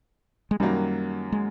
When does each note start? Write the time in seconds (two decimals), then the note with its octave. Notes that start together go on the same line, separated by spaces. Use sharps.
0.51 G#3
0.60 F#2 D#3 F#3 G3 A#3
1.32 G#3